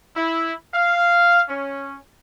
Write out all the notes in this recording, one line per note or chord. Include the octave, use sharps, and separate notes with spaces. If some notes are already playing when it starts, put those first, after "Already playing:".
E4
F5
C#4